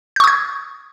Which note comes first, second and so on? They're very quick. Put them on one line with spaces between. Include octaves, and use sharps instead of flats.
G6 C#6 D#6 G#6